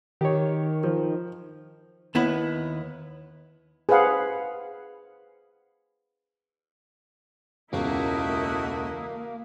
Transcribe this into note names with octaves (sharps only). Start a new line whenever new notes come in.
D#3 G4 C#5
F3
D#2 B3 E4 B4
G#4 B4 C5 F5 F#5
E1 C#2 A3 A#3 E4 F#4 A#4 D#5